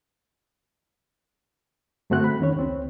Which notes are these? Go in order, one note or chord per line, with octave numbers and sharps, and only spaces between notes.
G2 D3 A3 C4 F#4 F#6
B5
E2 D#3 C#4 C#5
C#2 C4